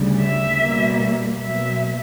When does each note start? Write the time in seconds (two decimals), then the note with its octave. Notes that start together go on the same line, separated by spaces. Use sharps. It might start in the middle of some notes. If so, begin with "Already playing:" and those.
Already playing: D2 C#3 G3
0.22 E5
0.62 B2 G3 A#3
1.41 B2 F#3 A#3 E5